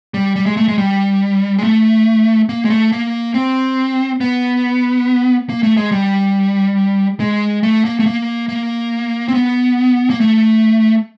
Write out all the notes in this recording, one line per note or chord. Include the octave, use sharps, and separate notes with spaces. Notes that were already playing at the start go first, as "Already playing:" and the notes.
G3
G3
G#3
A3
G#3
G3
G#3
A3
A#3
G#3
A3
A#3
C4
B3
A#3
A3
G#3
G3
G#3
A3
A#3
A3
A#3
A#3
C4
B3
A#3
A3